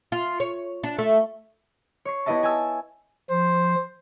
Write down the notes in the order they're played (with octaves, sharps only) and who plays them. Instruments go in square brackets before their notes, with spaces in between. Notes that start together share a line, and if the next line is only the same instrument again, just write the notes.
[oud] F4
C#5
D4
A3
[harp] C#5 C7
B3 E4 G4 D#5 E5 A5
G#5 A5 E6
[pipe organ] F3 [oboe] C5